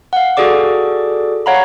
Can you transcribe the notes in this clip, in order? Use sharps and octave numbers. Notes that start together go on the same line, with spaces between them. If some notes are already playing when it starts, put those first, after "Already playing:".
F5 F#5
F#4 G#4 A4 D5 D6
C#5 F5 F#5 A#5 B5